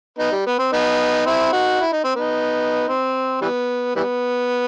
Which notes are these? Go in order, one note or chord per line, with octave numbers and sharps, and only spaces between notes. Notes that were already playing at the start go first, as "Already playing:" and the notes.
B3 D#4
G3
B3
C4
B3 D#4
C4 E4
D#4 F#4
E4
D#4
C4
B3 D#4
C4
E3 G3 B3
E3 G3 B3